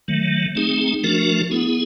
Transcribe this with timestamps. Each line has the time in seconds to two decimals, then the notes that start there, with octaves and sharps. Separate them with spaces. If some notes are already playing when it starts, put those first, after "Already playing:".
0.08 D#3 F#3 A3
0.55 A3 C4 D#4 G#4
1.03 F3 A3 D4 F#4 A#4
1.51 B3 E4 G#4